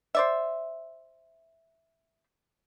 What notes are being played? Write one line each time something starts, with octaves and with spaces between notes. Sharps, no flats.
C5 D5 E5